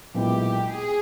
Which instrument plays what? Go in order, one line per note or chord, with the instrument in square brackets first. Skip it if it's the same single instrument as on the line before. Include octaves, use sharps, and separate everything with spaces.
[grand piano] B1 A#2 G#3 B3 E4 [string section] G4
[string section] G#4